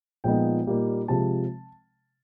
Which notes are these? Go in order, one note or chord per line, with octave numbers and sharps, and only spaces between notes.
A#2 F3 G#3 B3 D#4 G5
A#2 G3 A#3 D#4
C3 F3 G#3 A5